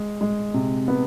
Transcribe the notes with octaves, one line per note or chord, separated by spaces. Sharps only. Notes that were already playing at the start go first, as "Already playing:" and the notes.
Already playing: G#3
G#3
C3
B3